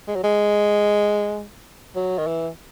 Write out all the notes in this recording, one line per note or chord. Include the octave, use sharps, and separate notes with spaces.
G#3
F#3
G#3
F#3
D#3
E3